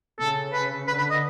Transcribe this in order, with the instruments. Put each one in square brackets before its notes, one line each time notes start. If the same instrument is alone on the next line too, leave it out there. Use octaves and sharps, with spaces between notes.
[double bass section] C#3 [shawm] A4
[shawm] B4
[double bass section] D3 [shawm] B4
[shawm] B4
D#5